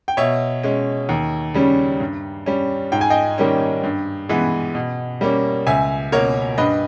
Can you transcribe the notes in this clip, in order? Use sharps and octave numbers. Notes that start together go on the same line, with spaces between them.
G5
B2 C#5 E5
G#3 C#4
D#2
C#3 G3 C#4
G2
G3 C#4
G#2 G5
G#5
D#5 G5
D#3 G3 A#3 C#4
G2
E3 G#3 B3
B2
G3 A#3 C#4
C#2 E5 G#5
B2 A#3 A#4 C#5
G2 B4 D#5